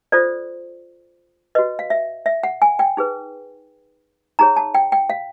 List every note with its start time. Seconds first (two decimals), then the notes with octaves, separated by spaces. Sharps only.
0.12 F4 A4 C5 D5
1.55 F#4 B4 D#5
1.79 F5
1.90 E5
2.26 E5
2.43 F#5
2.62 G#5
2.79 G5
2.97 D#4 G#4 B4
4.39 D#4 G#4 C#5 A#5
4.57 A5
4.74 G5
4.92 G5
5.10 F5